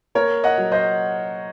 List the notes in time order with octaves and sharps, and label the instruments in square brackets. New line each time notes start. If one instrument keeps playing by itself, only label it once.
[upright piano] A#3 A#4 C#5
D#5 F#5
F#3
C5 D#5